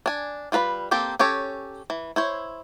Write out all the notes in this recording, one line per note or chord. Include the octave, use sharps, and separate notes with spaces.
D4 G#5
G3 F4 B4 A#5 B5
A#3 C4 G4 A4
C#4 G4 A4 C#5
E3
E4 C5 C#5